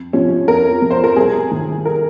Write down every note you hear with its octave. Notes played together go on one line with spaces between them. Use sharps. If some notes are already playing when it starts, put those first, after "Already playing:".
Already playing: F2
C3 F3 C#4
F2 A#4
C3 F3
C5
A#4
C2 G#4
C3 D#3
A#4